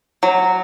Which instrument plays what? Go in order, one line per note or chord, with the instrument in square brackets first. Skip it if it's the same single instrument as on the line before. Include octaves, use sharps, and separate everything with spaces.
[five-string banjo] F#3